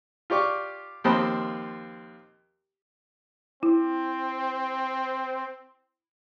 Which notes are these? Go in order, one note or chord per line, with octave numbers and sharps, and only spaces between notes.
F4 G4 D5 C#6 D6
D#2 F3 C4 D#5 A5 B5
C4 E4